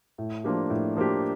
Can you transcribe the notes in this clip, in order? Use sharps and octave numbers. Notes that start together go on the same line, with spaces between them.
A2
F3 A#3 D4 G4
A2
F3 A#3 D4 G4